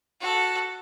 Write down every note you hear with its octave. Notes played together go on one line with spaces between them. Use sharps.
F#4 A4